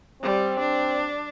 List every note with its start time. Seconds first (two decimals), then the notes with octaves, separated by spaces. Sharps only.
0.22 G3 C4
0.59 D4